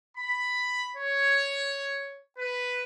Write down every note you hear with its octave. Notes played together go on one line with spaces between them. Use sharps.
B5
C#5
B4